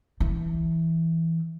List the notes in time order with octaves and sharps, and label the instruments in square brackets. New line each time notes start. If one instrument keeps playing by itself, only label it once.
[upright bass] E3